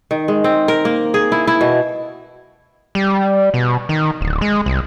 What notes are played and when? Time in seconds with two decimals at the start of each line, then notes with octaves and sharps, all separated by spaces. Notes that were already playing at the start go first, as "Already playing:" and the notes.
0.11 D#3
0.28 G#3
0.44 C4
0.68 A#4
0.85 A#3
1.14 G#4
1.32 E4
1.47 E4
1.61 B2
2.95 G3
3.54 B2
3.89 D#3
4.21 D1
4.42 G#3
4.66 C2